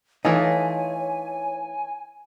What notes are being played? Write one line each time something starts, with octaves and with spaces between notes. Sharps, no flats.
E3 A3 D#4 F4 C#5 G#5